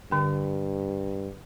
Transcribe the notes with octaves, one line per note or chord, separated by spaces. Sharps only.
G2 D3 G5